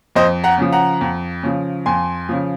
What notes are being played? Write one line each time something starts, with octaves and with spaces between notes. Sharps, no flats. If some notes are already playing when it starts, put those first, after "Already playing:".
F2 C5 D#5
F#5 A#5
C#3 F3
F#5 A#5
F2
C#3 F3
F2 G#5 C6
C#3 F3